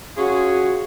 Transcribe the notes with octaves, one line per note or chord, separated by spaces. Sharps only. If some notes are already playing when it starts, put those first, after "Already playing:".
C#4 F4 F#4 G#4